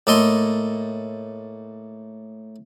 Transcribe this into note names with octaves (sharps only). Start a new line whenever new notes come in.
A2 A#3 A4 D#5 C6